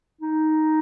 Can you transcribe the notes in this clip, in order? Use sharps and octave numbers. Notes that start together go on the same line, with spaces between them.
D#4